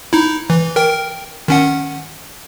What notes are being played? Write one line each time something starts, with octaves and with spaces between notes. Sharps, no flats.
D#4 E4
E3
A#4 G5
D#3 C#4 F#5